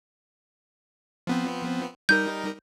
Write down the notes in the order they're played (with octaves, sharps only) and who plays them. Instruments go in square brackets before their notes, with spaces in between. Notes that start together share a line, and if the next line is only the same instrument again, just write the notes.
[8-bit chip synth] F3 B3 C4
[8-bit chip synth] G3 D#4 A#4 [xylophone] G6